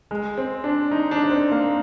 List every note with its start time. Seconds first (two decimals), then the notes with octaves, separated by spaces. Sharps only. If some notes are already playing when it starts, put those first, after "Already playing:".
0.11 G#3
0.38 C4
0.64 D4
0.91 D#4
1.11 D4
1.23 D4
1.31 C4
1.52 A#3